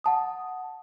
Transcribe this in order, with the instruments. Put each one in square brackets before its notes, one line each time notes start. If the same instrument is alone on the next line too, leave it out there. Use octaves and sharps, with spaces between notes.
[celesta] F#5 A5 D#6